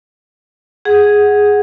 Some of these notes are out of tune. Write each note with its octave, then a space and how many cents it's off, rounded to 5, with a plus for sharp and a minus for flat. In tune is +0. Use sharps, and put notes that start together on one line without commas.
G#4 +0 F#5 +0